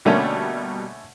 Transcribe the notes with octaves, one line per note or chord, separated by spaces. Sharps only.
B2 D3 G3 A3 A#3 C#4